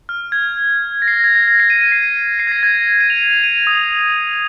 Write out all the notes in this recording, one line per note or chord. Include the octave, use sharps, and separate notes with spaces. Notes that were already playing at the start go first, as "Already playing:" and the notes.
F6
G#6
A#6
C7
A#6
G#6
A#6
A#6
C7
D#7
D#7
C7
D#7
C7
G#6
A#6
G#6
A#6
D#7
F7
D#7
F7
D#7
F7
D#6